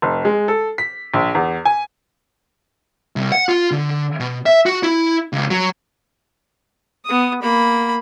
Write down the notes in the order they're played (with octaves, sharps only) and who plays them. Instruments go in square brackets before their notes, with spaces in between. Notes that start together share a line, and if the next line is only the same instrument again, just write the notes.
[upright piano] F1
G#3
A4
B6
A#1
E2
G#5
[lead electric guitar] C2
F#5
F4
D3
B2
E5
F#4
E4
C#2
F#3
[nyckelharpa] B3 D#6
A#3 B5